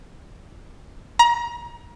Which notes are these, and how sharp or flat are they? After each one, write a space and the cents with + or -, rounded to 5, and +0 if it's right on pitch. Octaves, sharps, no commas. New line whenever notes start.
A#5 +30